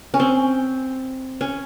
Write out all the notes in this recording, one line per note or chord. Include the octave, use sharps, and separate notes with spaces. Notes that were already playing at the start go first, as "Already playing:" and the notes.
C#4
C4
C#4